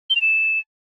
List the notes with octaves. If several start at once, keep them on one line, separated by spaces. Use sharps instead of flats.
G7
F7
E7